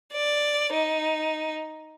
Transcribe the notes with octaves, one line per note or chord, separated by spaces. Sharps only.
D5
D#4